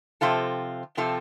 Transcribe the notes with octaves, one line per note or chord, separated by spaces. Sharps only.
C3 F3 C4 F4 A4
C3 F3 C4 F4 A4